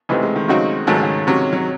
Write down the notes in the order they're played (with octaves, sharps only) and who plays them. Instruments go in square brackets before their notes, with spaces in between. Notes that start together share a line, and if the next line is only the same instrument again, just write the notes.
[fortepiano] C#2 C3 E3 C4 D#4 [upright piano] A3
[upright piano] G#3
D#3
[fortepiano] C#3 F#3 C4 D#4 F#4
[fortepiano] G#2 F#3 A3 [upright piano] D#3
[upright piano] C#3
D#3
[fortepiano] C3 F#3 C#4
[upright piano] F#3